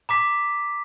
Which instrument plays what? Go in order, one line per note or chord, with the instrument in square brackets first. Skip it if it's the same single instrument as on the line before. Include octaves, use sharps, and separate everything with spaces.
[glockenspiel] A#5 D6 B6